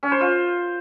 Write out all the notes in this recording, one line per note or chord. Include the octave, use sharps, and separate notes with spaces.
C#4
C5
F4